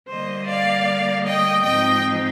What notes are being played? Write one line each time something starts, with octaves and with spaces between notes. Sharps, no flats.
D3 G3 A#3 C5 D#5
D5 F5
D#5 G5
G#2 F3 C4 D#4 D#5 G5